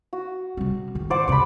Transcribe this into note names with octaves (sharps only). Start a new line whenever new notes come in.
F#4
C3 G3
G#2 D#3
C5 D5 F#5
C3 G#3 D5 B5